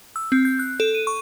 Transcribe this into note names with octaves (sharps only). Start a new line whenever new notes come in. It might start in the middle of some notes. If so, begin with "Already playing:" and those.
E6
C4
G6
F#6
A4
D#7
C#6